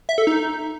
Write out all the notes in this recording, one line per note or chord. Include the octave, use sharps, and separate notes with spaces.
E5
A4
D#4